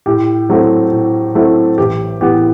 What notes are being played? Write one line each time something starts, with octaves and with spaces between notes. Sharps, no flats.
A2 G4
F#3 A3 C4 E4
A2
F#3 A3 C4 E4
A1 G4
A2 E3 B3 G4